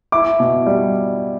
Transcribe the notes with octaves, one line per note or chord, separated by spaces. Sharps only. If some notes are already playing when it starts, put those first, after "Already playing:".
E4 D6
B2
G3